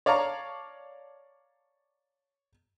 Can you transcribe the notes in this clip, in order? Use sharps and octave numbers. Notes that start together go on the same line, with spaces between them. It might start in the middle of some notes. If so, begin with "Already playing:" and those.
C#5 D5 F5 A5 A#5 C#6